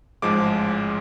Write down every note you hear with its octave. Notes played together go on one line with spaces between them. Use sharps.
A1 G#2 F3 G#3 D6